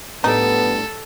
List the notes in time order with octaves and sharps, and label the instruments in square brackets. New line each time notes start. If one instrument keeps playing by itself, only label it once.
[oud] A2 G3 D4 [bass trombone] B3 [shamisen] D#4 [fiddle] A4